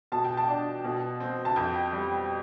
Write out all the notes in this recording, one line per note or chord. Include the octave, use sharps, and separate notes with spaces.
B2 A5
G5
A5
D4
B2
C4
A5
F2 G5
G3